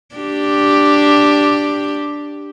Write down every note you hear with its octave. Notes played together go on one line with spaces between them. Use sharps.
D4 G4